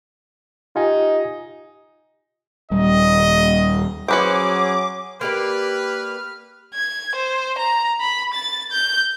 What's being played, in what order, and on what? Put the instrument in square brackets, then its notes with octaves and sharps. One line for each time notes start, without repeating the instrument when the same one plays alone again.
[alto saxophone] D#4 [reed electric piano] F4 G4 G#5
[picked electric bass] D#1 G3 [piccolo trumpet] D#5
[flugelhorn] F#3 [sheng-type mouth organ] C#4 G#4 [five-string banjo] F#4 B4 C5 [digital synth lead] D6
[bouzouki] A#3 G4 D5 [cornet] B4 [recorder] F6
[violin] G#6
C5
A#5
B5
A6
G6